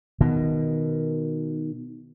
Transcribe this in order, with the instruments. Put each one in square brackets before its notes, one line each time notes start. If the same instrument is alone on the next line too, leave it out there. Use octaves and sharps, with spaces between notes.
[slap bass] B2 D#3